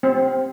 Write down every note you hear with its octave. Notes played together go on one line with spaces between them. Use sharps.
C4